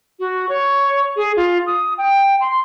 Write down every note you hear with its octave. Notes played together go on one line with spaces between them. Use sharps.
F#4
C#5
G#4
F4
D#6
G5
C6